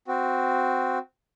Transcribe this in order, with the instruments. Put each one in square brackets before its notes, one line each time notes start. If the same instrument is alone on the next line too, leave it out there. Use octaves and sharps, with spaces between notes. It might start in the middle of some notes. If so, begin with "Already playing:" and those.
[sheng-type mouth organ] C4 F#4